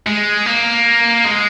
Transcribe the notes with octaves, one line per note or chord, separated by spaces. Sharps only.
G#3
A#3
G#3